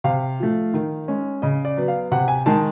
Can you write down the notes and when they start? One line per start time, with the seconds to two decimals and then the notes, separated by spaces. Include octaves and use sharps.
0.04 C3 F5
0.40 F3 A3
0.74 D#3
1.08 G#3 C#4
1.42 C#3 D#5
1.65 D5
1.77 F#3 B3
1.88 F5
2.12 C3 F#5
2.28 G#5
2.46 D#3 G#3 A5